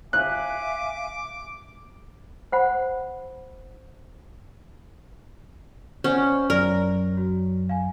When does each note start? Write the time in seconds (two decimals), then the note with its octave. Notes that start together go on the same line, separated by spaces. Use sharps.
0.13 E5 F5 G#5 D6 F#6
2.52 C5 F#5 B5
6.04 C#4 C5 D5 F#5
6.50 F#2 A#4 D5
7.17 F#4
7.69 F5 G#5